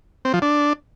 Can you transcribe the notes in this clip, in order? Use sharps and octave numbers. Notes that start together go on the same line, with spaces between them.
C4
F3
D4